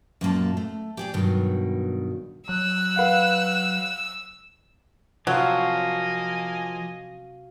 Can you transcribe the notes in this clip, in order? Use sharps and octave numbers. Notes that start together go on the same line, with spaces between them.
F#2 A#2 A#3 A5
A3
G4 G#4 D5
G2 B2 D#3 F#3
F#3 E6 F#6
B4 F5 F#5
C3 F3 F#3 A#3 F#4 D#5 F5 G#5